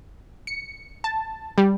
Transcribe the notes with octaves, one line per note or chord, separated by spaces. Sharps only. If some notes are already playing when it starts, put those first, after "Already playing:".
C#7
A5
G3